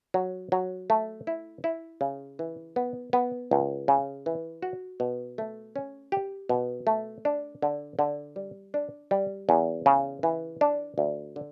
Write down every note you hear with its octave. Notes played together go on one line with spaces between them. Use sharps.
F#3
F#3
A3
E4
E4
C#3
E3
B3
B3
C#2
C#3
E3
F#4
B2
A3
C#4
G4
B2
A3
D4
D3
D3
G3
D4
G3
E2
C#3
E3
D4
D2
D3